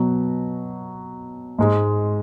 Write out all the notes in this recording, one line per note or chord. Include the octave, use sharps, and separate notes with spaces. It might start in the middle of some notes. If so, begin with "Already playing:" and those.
Already playing: B2 F#3
G#2 G#3